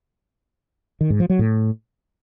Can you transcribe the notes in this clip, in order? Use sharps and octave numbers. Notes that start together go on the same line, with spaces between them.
D#3
G#2
F3
F#3
A2